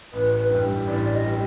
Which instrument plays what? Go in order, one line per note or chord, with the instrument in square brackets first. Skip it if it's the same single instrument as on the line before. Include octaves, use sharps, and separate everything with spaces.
[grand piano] A1 [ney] B4
[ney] B4
[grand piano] G2 E3 G3
[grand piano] A1 [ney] D5
[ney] D#5
[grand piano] E3 G3